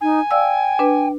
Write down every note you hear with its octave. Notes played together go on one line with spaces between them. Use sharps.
D#4 G#5
D5 F5 G5 E6
D4 B4